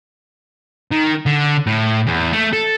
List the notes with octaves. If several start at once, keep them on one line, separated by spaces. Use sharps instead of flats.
D#3
D3
A2
E2
A3
A4